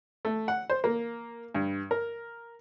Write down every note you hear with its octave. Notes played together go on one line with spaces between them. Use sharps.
A3
F#5
C5
A#3
G2
A#4